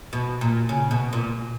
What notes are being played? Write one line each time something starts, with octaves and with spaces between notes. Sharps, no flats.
B2
A#2
C#3
B2
A#2